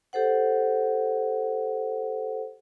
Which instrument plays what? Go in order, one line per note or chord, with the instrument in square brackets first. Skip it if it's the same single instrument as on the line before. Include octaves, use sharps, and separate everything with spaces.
[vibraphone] G4 A4 C5 F#5